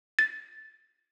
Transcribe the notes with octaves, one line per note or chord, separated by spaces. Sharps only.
A6